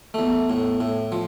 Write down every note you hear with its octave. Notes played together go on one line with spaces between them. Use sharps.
E2 A3
A2
A2
F3